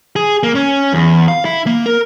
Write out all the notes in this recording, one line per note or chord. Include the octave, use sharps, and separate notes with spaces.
G#4
A#3
C#4
E2
F5
E4
A#3
A#4